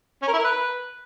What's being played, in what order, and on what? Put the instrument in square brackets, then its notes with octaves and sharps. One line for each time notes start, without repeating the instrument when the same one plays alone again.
[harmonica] C#4
A#4
E4
A#4
B4